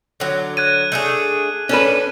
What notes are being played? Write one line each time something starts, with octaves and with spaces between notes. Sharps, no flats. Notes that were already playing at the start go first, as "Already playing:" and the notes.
D3 F#3
F#6 G#6 D#7
A3 D4 G#4
C#4 D4 A4 B4